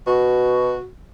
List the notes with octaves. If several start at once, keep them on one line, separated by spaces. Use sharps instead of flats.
B2 F#4